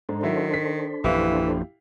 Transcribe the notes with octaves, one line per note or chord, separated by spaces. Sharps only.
G#2 D4 A4 C5
D#3 F#3 E4 E5
B6
A#1 F#2 E3 E4 G4 F5